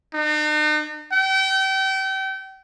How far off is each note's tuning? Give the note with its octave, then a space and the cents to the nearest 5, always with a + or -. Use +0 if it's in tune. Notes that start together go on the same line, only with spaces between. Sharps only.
D#4 -45
G5 -35